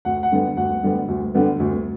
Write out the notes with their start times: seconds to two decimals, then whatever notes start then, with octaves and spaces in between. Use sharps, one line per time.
0.05 D2 F#5
0.23 F#5
0.32 D3 G3 B3
0.57 D2 F#5
0.83 D3 G3 B3
1.08 D2
1.35 D3 G3 B3
1.60 D2